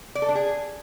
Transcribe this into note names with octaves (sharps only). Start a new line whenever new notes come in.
D5
A4
D4
G#4